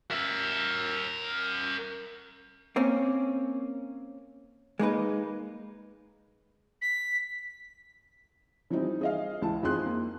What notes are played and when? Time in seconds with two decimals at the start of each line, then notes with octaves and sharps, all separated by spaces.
0.11 A#4 E5
2.76 A#3 C4 C#4
4.79 G#3 A#3 D#4 B4
6.82 B6
8.70 E3 F3 G3 C4 D#4
9.01 G#4 D#5 F5
9.42 C#2 E3 A5
9.63 F2 F3 D#4 G#4 C6 F#6
9.86 A#3